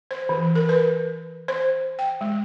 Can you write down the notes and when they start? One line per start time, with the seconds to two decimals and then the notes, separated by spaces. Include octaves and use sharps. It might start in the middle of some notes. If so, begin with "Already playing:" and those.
0.11 C5
0.29 E3
0.55 A#4
0.69 B4
1.48 C5
1.99 G5
2.21 G#3